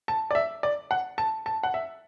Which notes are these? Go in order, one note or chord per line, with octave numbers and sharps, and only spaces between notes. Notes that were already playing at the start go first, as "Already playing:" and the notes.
A5
D5
E5
D5
F#5
A5
A5
F#5
E5